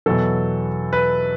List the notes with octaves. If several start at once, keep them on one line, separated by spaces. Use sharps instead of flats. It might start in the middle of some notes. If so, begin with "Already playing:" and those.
E2 B2 F#3 A4
B4